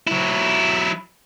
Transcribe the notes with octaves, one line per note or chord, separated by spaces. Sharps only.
F#3 E4